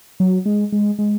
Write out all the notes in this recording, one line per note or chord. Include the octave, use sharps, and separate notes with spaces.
F#3
G#3
G#3
G#3